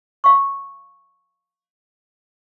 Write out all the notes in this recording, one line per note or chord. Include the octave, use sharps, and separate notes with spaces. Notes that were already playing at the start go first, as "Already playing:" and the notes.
F5 C#6